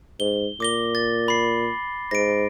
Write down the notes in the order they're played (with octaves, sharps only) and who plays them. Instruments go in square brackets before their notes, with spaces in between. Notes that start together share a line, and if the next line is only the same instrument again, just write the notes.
[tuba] G#2 [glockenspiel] G7
[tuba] A#2 [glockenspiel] D6 A#6 G7
[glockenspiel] A6
B5 C7
[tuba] G#2 [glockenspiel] A#6 D7